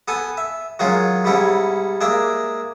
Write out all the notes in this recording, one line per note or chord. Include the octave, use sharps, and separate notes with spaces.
B3 A4 G#5 A5
E5
D#3 F#3 G#3 C#4 F4
G#2 B2 G3 C#4 E4 G4
G#3 A#3 D5 E5